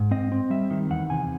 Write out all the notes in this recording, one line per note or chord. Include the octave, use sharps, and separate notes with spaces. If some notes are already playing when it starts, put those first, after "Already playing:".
Already playing: G#2
C4 D#5
C4
G3 E5
D#3
E2 F#5
C3 G#5